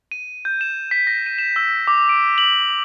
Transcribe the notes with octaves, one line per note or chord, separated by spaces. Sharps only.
D#7
G6
E7
B6
A#6
D#7
E7
E6
D6
D7
F#7